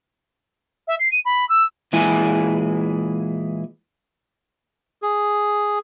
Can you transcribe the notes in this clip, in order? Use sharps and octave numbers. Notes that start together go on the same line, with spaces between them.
E5
C7
D#7
B5
E6
A#2 E3 G#3 E4 G#4 G#5
G#4